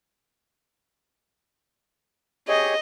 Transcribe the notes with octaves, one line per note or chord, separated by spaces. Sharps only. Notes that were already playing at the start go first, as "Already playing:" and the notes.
G4 G#4 C#5 D#5